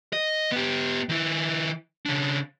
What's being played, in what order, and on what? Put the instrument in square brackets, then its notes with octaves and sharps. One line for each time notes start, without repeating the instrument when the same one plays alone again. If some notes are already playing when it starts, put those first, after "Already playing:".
[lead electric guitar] D#5
B3 G4
D#3 E4
C#3 D4